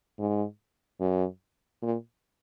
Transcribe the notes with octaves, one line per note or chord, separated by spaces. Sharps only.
G#2
F#2
A#2